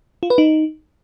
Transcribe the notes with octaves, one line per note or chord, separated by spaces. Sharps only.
F4
B4
D#4